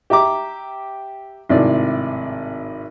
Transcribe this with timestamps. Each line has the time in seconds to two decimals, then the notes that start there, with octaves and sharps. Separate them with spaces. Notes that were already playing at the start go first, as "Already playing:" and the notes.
0.10 G4 E5 A#5 D6
1.49 G#1 A2 C3 D5